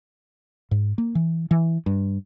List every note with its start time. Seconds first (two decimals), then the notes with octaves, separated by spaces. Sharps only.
0.71 G#2
0.98 A#3
1.15 E3
1.51 E3
1.86 G2